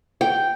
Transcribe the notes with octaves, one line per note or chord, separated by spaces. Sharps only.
G5